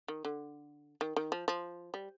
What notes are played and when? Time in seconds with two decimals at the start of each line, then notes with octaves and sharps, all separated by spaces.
0.08 D#3
0.25 D3
1.01 D#3
1.16 D#3
1.32 F3
1.48 F3
1.94 G3